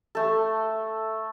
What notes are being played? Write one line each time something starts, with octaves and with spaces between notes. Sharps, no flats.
A3 A4